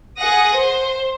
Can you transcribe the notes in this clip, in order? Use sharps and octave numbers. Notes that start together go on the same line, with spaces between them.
G#4 F#5 D#6 A#6
C5